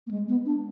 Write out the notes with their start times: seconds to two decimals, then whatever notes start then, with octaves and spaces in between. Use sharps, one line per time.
0.07 A#3
0.11 G#3
0.29 B3
0.45 D4